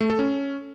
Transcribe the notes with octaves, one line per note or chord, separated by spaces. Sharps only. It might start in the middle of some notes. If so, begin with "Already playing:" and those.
A3
A4
C#4